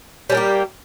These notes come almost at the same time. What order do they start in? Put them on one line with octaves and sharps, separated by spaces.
G3 C#4 A#3 G4